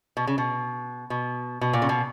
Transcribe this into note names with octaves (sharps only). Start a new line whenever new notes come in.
B2
C#3
B2
B2
B2
A#2
C#3
B2